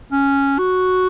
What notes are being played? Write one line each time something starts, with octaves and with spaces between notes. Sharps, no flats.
C#4
F#4